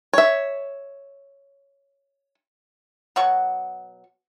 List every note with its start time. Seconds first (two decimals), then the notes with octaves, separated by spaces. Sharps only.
0.13 C#5 E5
3.16 B2 F#3 F#5 C#6